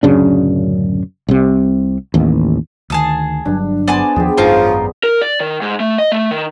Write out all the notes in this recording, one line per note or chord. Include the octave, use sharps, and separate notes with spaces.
D1 F#2 C#3 D4
C2 C3
A1 D#2
D2 D#3 G#4 A5 D#6
G1 G2 F#3 D4
B3 C5 D5 G#5 A5
D#2 F3 B3 G4 G#4
G#1 F#2 C#3 F3 D#4 F4 A#4
A#4
D5
D#3
G#2
A3
D#5
A3
D#3